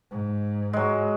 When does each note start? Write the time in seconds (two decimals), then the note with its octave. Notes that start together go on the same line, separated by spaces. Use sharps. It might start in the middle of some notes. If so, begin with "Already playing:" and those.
0.11 G#2
0.73 F#3 G#3